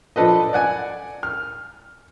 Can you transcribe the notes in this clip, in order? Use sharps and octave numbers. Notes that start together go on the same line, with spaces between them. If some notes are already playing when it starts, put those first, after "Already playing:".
F3 D4 A4 B4 D#5
D5 F#5 G#5
F6